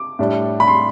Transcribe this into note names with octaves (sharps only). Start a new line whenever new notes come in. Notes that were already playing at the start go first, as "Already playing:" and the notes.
Already playing: D6
A2 G3 D4
B5
C6